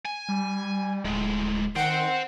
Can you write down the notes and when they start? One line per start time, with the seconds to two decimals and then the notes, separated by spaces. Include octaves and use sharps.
0.05 G#5
0.29 G3
1.05 D1 A2 G#3
1.76 D#3 C5 F#5 G5